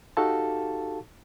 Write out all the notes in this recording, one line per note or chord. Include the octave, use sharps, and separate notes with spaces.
D#4 F#4 G4 A4 F5 A5